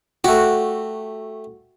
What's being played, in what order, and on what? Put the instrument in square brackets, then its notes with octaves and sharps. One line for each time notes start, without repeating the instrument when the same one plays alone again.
[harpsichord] A3 G4 [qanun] F#4